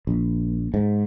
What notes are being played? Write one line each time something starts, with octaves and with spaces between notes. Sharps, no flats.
A#1
G#2